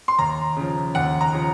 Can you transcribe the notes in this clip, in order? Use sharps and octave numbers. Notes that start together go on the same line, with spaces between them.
C6
D#2 A#5
C#3 F3
D#2 F#5
A#5
C#3 F3